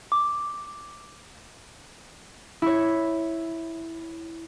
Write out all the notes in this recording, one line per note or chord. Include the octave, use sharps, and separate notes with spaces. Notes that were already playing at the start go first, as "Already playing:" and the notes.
D6
E4 C#5